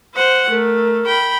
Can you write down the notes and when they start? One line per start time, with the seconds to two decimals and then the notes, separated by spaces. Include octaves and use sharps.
0.15 C5 F#5
0.50 A3 A#4
1.06 G5 B5